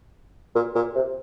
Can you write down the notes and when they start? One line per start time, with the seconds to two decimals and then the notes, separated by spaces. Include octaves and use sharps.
0.55 A#2
0.75 A#2
0.95 C3